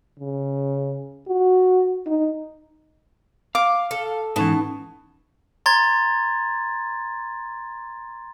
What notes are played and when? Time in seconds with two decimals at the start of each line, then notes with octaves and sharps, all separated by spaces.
0.19 C#3
1.27 F#4
2.06 D#4
3.55 F5 D6
3.91 A4
4.36 G#2 E3 B3 C#4 D#4 A5
5.66 A#5 C6 G#6 A6